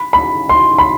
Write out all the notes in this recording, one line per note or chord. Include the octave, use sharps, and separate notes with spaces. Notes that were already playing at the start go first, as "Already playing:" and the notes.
Already playing: B5
B5
C6
B5